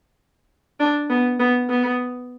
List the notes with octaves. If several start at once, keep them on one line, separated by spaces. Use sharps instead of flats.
D4
B3
B3
B3